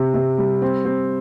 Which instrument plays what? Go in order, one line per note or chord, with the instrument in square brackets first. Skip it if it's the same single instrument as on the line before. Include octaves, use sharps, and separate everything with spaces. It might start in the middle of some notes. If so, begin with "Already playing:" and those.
Already playing: [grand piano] C3 G4
C3
G3
C4
C4